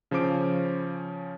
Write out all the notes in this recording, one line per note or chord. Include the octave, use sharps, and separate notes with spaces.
C#3 F3 C#4 C5 D6 D7